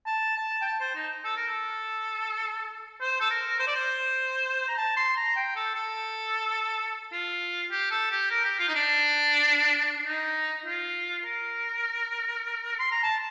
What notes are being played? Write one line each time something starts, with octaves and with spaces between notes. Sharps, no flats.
A5
A5
G5
A5
C5
D#4
A4
A#4
A4
C5
A4
A#4
C5
D5
C5
A#5
A5
C6
A#5
G5
A4
A4
F4
G4
A4
G4
A#4
G4
F4
D#4
D4
D#4
F4
A#4
C6
A#5
A5